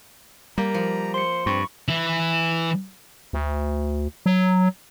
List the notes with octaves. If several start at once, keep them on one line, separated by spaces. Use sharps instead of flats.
G3 A#3 A#5
F3
C5 C6 C#7
G2 C4 B5 C#6
E3 E4
D2
F#3